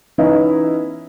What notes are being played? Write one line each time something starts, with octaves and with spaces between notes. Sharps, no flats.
E3 B3 C#4 D#4 E4